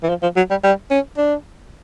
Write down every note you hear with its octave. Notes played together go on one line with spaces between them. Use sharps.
E3
F3
F3
F#3
G3
G3
C#4
D4